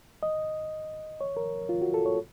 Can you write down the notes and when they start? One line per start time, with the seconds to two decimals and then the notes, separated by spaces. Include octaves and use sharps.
0.23 D#5
1.21 C#5
1.37 A#4
1.69 F4
1.82 F#4
1.94 A4
2.06 C#5